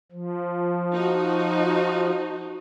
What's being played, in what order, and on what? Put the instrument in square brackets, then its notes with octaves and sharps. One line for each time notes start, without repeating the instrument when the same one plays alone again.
[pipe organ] F3
[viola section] D#4 F#4